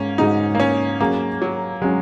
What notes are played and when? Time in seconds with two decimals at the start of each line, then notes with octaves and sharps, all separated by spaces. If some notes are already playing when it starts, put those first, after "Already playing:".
Already playing: G#2 G#3 A#3 C#4
0.18 G#2 G#3 D#4 F#4
0.55 A#3
0.60 C#4
1.00 F#3 A#3 C#4 G#4
1.42 F#3
1.81 F#3 G#3 C#4 G#4